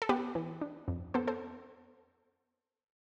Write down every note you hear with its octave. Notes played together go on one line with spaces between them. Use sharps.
A4
B3 G4 B4
E3
D4
F2
B3 A4 C5
A4 C5